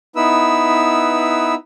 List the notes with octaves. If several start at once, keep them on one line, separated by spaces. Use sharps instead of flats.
B3 D#4 E4 B4 E6